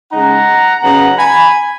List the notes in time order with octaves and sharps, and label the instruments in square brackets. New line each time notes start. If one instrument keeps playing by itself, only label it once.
[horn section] C#3 G#3 D#4 F#5 A#5
C#3 F#3 B3 D#4 F#5 A#5
G#5 B5